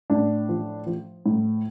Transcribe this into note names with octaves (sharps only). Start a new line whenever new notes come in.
A2 D4
F3
F3
A2